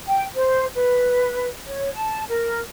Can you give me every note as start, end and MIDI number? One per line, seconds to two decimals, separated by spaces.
0.07 0.25 79
0.35 0.66 72
0.75 1.48 71
1.66 1.90 73
1.96 2.23 81
2.29 2.61 70